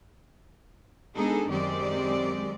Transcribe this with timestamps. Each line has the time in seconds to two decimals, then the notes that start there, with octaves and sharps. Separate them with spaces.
1.15 G#3 B3 D4 D#4 G#4 A4
1.48 F#2 D#3 G#3 C4 G4 D5